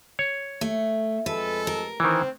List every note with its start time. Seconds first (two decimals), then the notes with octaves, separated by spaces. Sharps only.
0.19 C#5
0.61 A3
1.26 F2 G#3 A4 B4
1.67 A#4
2.00 D#3 E3 C4